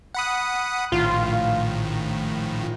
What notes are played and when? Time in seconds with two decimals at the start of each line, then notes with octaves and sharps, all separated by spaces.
0.15 F#5 B5 D#6
0.92 A#1 A2 D#3 F4